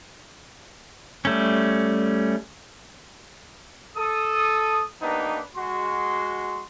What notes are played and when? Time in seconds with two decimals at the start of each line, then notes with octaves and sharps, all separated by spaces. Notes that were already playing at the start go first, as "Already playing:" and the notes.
1.25 G3 A3 C#4
3.97 A4 D#6
5.02 A#3 B3 D4 D#4 G4 B4
5.56 G#3 F#4 C6